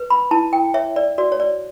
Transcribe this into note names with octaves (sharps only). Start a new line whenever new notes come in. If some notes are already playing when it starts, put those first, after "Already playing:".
Already playing: B4
B5
E4 A5
G5
C#5 E5
D5
F#4 D5
C#5
D5